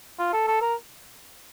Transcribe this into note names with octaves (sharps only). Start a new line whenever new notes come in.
F4
A4
A4
A#4